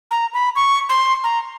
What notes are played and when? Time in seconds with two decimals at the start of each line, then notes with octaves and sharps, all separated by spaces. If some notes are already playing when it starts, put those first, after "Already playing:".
0.11 A#5
0.34 B5
0.56 C#6
0.89 C6
1.24 A#5